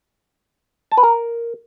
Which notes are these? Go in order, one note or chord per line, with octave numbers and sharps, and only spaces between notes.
A5
B4
A#4